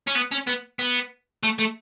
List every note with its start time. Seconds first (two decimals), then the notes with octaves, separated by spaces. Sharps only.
0.07 C#4
0.15 B3
0.32 C#4
0.47 B3
0.79 B3
1.43 A3
1.59 A3